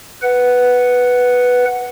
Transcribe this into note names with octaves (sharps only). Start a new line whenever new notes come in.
B4 F#5